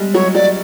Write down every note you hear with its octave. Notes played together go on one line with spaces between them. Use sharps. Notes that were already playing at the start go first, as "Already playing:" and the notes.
Already playing: G3 G#3
F#3 C#5
F#3 D5